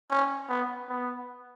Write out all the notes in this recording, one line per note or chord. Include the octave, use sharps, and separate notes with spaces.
C#4
B3
B3